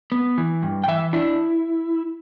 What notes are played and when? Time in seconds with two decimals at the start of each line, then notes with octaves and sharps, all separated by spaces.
0.12 B3
0.38 E3
0.63 G2
0.84 G5
0.88 E3 E5
1.13 D4 E4